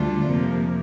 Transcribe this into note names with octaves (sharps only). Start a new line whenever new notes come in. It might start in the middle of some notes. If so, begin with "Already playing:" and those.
Already playing: D2 D3 G3 D4 F4
F2 C3 F3 A#3